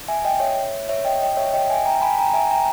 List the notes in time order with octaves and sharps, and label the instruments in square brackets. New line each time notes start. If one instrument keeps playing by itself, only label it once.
[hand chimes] E5 G#5
D#5 G5
C#5 E5
C#5 E5
D#5 G5
D#5 G5
C#5 E5
D#5 G5
E5 G#5
G5 A#5
G#5 B5
G5 A#5
E5 G#5
G5 A#5